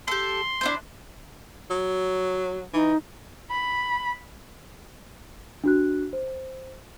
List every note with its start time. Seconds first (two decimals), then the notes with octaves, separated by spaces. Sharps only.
0.08 G4 A4 C6
0.61 D4 E4 C5
1.71 F#3
2.74 E3 D#4
3.50 B5
5.64 D4 F#4 F#6
6.13 C5